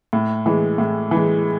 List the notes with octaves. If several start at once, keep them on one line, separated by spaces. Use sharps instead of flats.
A2
E3 G#3
A2
E3
G#3